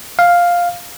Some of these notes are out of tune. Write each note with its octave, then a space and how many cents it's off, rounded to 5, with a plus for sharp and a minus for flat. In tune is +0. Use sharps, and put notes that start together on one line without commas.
F5 +5